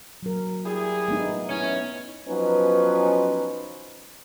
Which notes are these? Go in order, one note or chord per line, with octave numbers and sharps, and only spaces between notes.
F#3 A#4
G3 E4 G#4
A3 B3 D#4
B3 C#4 E4
F3 F#3 B3 C#4 D#4 B4